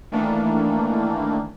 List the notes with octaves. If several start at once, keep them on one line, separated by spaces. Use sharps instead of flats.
D#3 E3 A3 A#3 D4